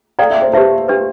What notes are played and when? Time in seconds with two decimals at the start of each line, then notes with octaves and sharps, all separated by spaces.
0.19 A4 D5 F5 G5 A#5
0.31 E5
0.42 C5
0.53 G4 B4 C5 E5 A5
0.88 D4 G4 B4